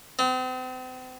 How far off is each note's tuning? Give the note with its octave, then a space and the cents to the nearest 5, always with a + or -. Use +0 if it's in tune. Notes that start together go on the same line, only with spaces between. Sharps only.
C4 -40